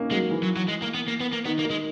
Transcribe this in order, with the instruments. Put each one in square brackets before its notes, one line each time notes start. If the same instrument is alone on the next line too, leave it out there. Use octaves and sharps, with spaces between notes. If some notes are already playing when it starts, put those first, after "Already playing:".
Already playing: [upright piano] A#3 C#4 D#4
[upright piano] F#3 [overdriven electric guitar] G#3
[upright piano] E3
[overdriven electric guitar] F#3
F#3
G#3
A#3
B3
A#3
B3
A#3
[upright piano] D#3 [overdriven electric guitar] B3
[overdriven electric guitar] A#3
[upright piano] D#3
[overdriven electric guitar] G#3